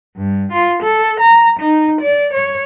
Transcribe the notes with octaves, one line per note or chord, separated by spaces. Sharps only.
G2
F4
A4
A#5
D#4
D5
C#5